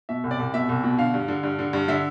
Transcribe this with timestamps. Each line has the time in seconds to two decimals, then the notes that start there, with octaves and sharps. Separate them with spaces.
0.09 B2 E5
0.24 C2
0.31 D5
0.39 C2
0.54 B2 E5
0.69 C2
0.84 B2
0.98 D3 F5
1.14 G2
1.28 D3
1.43 G2
1.59 D3
1.73 G2
1.88 D3 E5